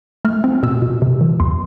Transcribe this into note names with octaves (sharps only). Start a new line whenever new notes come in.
A3 F6
C4
B2 E6
B2
C3
E3
E2 C6